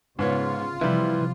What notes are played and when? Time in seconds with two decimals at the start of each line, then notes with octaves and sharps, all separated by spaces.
0.19 G#2 C#3 B3 F4 C#5
0.81 C3 E3 F3 G3 E4